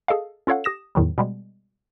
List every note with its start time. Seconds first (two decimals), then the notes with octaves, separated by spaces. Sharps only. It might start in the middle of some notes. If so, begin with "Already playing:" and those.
0.08 G#4 A4 D#5 F5
0.47 C#4 F4 A4 C#5 F5 F#5
0.64 G4 D#6 A#6 E7
0.95 E2 A2 D#3 F#3 G3
1.18 B2 G3 G#3